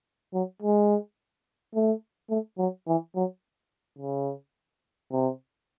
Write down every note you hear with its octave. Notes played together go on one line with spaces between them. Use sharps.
F#3
G#3
A3
A3
F#3
E3
F#3
C#3
C3